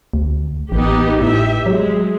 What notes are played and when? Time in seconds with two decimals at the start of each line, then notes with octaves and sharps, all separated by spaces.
0.14 D2
0.72 A1 B3 D#4 G4
1.21 A2 G4 E5
1.66 F#3 G#3